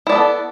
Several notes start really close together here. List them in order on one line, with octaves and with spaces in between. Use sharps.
E4 D5 B3 A4